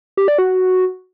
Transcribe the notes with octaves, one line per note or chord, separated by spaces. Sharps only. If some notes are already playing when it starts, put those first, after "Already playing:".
G4
D5
F#4